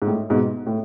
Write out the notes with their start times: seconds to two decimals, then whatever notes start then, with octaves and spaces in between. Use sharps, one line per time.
0.02 G#2
0.07 A2
0.30 G#2 B2
0.67 A2